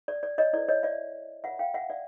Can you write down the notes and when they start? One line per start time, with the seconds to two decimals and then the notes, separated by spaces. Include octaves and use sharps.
0.08 D5
0.23 D5
0.38 C#5 D#5
0.53 E4 A4 C5 D5
0.69 C#5 D#5
0.83 D5 E5
1.44 F4 A#4 C#5 E5 F#5
1.59 F5 G5
1.74 E5 F#5
1.90 D5 E5